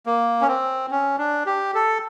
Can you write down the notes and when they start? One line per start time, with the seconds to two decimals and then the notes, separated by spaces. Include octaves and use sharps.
0.06 A#3
0.41 C#4
0.48 C4
0.91 C#4
1.18 D4
1.46 G4
1.75 A4